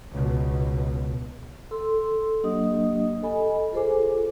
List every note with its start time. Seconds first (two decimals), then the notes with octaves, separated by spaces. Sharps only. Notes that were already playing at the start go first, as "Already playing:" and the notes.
0.11 C#2 B2
1.71 A4 C6 E6
2.43 F#3 A#3 D4 G4 D#5 D#6
3.22 A4 D#5 G#5 B5
3.72 F4 G#4 A4 C5 G#5 D6